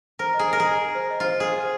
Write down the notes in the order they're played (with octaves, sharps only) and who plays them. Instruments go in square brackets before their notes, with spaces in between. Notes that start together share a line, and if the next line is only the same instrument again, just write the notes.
[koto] A#4 [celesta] C5
[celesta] D#5
[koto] G#4
[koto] A#4 [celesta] D#5
[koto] G#4 [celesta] A#5
[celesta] A#5
C5
D#5
[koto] F4 [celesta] C5
[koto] G#4 [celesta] C5
[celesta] C5